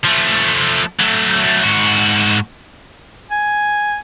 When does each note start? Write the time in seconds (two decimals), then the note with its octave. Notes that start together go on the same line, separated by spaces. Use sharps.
0.04 F3 A3
0.99 F#3 A3
1.63 G#2 F#4
3.31 G#5